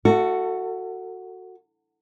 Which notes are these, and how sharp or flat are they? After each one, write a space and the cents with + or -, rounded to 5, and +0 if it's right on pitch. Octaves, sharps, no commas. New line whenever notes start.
F#4 +0 A4 +25 E5 +45